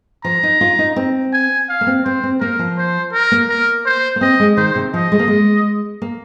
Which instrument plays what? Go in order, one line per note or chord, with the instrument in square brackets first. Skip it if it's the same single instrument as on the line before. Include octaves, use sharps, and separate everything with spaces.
[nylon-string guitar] F3 [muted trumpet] A#5
[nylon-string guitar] D#4
F4
D#4
C4
[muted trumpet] G#5
F5
[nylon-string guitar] A#3
C4
[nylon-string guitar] C4 [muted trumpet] C5
[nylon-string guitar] C4
[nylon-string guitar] A#3 [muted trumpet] A#4
[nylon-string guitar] F3
[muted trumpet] C5
A#4
[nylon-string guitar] A#3
[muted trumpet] A#4
C5
[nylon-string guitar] A#3
[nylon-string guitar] C4 [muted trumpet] D#5
[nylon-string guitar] G#3
[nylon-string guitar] D#3 [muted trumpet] C5
[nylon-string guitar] C3
[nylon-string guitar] F3 [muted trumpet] D#5
[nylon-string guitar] G#3
A#3
G#3
A#3